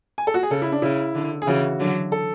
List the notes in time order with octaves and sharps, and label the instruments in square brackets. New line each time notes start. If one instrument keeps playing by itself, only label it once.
[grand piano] G#5
A4
F#4
G#4
[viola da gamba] C#3 [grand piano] A4
[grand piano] E4
D4
[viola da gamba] C#3 [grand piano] E4
[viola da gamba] D3
[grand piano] G#4
[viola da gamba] C#3 E3 [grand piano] F#4
[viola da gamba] D3 F#3
[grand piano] A4